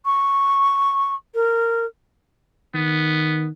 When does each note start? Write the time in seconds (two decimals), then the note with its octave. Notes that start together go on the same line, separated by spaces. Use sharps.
0.05 C#6
1.34 A#4
2.75 D#3 B3